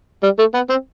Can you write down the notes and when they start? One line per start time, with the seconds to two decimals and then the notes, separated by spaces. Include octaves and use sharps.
0.23 G3
0.39 A3
0.54 B3
0.70 C4